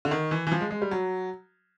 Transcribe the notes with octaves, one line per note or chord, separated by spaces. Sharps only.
D3
D#3
E3
E3
F3
G#3
G#3
G3
F#3